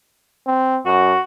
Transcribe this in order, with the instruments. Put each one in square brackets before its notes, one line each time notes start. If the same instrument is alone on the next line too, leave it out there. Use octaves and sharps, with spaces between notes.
[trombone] C4
[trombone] F#2 [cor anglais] F#4